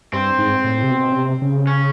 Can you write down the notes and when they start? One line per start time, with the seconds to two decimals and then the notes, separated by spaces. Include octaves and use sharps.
0.13 G2 C4
0.38 G#2
0.64 A2
0.83 C3
0.91 B2
1.12 C#3
1.15 C3
1.42 C#3
1.67 C#4